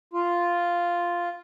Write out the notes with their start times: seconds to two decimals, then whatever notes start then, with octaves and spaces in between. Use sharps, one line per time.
0.13 F4